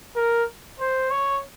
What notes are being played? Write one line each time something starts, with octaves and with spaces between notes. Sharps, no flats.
A#4
C5
C#5